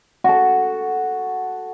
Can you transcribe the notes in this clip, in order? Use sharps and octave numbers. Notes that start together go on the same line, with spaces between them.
F#4 A4